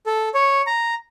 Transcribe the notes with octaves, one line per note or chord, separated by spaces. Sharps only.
A4
C#5
A#5